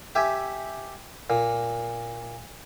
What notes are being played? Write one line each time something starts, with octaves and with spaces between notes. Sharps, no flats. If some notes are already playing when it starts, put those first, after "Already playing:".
G4 E5 G#5
A#2